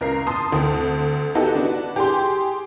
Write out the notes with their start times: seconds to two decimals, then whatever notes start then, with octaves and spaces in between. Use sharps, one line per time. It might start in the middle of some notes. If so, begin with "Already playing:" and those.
0.01 C#2 A#4 A#5 C7
0.27 A5 C6 D#6
0.52 D2 C4
1.35 B3 D#4 E4 F#4 G4 A4
1.55 B3 D4 F#4
1.96 G4 G#4 C6